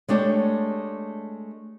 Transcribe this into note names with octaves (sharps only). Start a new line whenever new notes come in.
G#3 A3 D4 G4 C#5